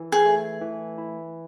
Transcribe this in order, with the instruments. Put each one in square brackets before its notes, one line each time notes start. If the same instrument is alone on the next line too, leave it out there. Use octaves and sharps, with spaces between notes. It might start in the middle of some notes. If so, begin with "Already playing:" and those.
Already playing: [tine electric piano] E3
[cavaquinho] G#4
[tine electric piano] A3
E3
E4